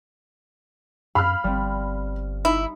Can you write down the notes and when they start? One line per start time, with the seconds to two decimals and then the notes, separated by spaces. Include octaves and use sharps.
1.15 F#2 F5 B5 F6
1.44 G1 G3 C4
2.45 D#4 E4